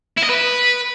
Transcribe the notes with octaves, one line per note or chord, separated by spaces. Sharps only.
E4
D#5
B4